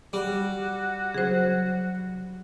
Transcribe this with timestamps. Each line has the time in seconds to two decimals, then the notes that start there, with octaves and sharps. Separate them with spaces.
0.13 G3 F#4 D6
1.14 C#3 F#3 G#4 C5